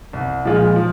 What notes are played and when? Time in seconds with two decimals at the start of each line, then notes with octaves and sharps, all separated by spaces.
0.13 C2
0.45 A#2 F3 G#3 F4
0.76 F3